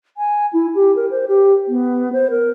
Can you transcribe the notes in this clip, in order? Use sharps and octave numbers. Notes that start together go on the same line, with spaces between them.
G#5
E4
G4
A#4
C5
G4
B3
C5
A#4